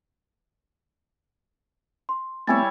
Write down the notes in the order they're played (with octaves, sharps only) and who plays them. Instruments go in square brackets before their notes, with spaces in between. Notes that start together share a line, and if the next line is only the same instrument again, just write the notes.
[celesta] C6
[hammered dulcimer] G3 E4 C#5 [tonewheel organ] A3 B3 C4 [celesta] G#5 A6